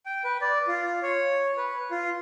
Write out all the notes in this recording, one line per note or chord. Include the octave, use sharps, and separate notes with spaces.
G5
B4
D5
F4
C#5
B4
F4